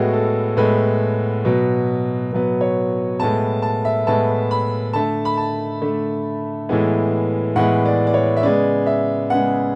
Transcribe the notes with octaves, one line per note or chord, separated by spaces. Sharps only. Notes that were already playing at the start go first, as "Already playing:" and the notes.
Already playing: A2 G#3 B3 F#4
A4
A2 G#3 B3 B4
B2 F#3 B3
B2 F#3 B3
C#5
A2 G#3 B3 A5
A5
E5
A2 G#3 B3 A5
B5
D3 A3 A5
B5
A5
D3 A3
A2 E3 G#3 B3
A2 E3 G#3 B3 F#5
D5
D5
C#5
E5
C#3 G#3 B3 D5
E5
C#3 G#3 B3 F#5